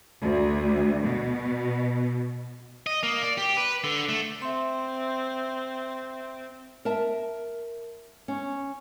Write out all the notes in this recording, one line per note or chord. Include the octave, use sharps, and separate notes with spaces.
D2
B2
D#5
A#3
D5
G4
B4
D3
A3
C4 E5 C6
A#4 E5 A5
C#4